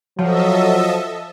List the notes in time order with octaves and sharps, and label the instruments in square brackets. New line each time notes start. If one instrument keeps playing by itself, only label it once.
[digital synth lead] F3 [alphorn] F#3 [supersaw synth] A4 D#5 E5